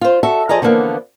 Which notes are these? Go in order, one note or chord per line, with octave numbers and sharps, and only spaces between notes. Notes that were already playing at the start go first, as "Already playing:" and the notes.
F4 C5
F#4 A4 E5
F3 G#4 D5 D#5 A#5
D3 E3 F3 A#3 B3